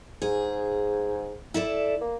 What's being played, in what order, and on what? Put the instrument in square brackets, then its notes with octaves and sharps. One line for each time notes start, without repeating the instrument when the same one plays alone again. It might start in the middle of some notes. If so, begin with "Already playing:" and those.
[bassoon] G#2 [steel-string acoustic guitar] G#4
[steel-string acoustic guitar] E4 A4 D5
[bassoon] A#3